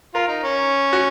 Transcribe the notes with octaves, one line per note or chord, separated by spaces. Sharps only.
F4 A#4
D#4
C#4
F#4